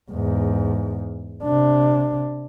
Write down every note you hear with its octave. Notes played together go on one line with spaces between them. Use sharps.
E2 G#2
C3 D4